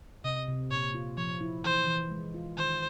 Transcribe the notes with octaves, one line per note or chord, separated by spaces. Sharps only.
C3 D#5
C3
A#2 C#5
F4
F3 C#5
E4
E3 C5
E3
G#3
F4
D#3 C5